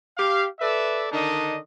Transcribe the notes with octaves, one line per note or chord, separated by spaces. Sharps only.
G4 F5
A4 B4 D5 E5
D3 D#3 D4 D#4 D#5